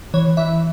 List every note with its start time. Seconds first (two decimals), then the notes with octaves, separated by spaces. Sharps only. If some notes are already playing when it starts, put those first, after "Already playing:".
0.14 E3 C#5
0.37 E3 E5